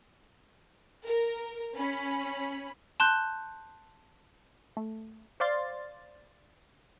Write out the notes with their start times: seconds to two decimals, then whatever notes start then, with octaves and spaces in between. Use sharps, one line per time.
1.06 A#4
1.76 C#4 B5
3.00 A5 C6 F#6 G6
4.77 A3
5.40 C5 D5 F5 C6 A6